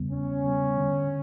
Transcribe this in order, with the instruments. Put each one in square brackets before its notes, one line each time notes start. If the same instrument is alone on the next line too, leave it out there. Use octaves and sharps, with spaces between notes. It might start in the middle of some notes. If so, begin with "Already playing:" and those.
Already playing: [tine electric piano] E2 C#3 G3 B3
[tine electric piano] E2 [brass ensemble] C#4
[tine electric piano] C#3 G3 B3
D3